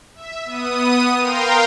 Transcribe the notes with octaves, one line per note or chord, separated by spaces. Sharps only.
E5
B3 D#6 D#7
A#4 F5 G5 A#5 C6